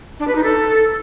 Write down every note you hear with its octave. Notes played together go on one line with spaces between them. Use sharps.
D4
B4
D#4
A4